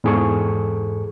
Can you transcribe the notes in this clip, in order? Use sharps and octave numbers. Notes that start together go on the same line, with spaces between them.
E2 G#2 G#4 A4 C#6